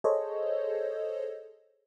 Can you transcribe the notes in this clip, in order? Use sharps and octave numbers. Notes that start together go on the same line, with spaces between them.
G#4 A4 C5 C#5 D#5